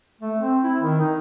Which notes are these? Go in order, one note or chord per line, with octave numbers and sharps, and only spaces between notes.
A3
C4
E4
D#3
D#4